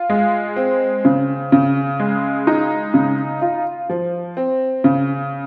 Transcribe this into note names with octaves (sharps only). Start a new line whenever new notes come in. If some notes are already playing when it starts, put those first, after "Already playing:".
Already playing: F4
G#3
C4
C#3
C#3
G#3
D#4
C#3
F4
F3
C4
C#3